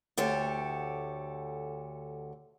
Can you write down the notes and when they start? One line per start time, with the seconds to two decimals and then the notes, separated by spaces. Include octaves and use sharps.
0.17 D2 G4 A4 C#5